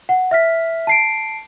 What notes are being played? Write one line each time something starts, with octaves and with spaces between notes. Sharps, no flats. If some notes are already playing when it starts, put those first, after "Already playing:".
F#5
E5 F6 B6
A5 C7 D7